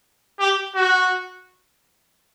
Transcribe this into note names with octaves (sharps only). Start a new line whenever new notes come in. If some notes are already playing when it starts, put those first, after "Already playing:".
G4
F#4